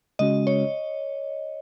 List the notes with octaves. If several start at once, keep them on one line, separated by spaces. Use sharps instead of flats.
C#3 G#3 C#4 F#4 D#5
C#5